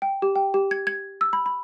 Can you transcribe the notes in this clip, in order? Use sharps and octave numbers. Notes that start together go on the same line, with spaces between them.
G5
G4
G5
G4
G#6
G#6
E6
B5
B5